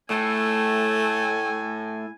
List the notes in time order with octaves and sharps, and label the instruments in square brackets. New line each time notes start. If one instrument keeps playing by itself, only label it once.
[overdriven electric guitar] A2 [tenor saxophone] A3 [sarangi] G#5